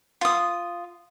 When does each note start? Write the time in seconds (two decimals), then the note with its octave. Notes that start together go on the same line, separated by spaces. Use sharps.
0.21 F4 D#6